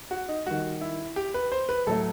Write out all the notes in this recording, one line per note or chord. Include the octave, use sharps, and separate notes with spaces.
F#4
D#4
D#3 G3 F#4
E4
G4
B4
C5
B4
A2 F#3 A3 A4